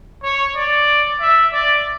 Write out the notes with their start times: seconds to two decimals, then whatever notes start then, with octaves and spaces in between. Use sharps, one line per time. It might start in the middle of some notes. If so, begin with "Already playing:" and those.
0.23 C#5
0.56 D5
1.21 E5
1.53 D5